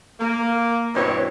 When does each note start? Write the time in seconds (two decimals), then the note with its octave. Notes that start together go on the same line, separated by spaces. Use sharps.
0.19 A#3
0.94 G2 B2 E3 C4 C#5